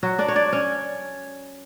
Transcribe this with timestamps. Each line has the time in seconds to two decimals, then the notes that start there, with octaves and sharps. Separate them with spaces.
0.03 F#3 F#4
0.19 D4 D5
0.28 C#5
0.36 D4 D5
0.53 C#4 C#5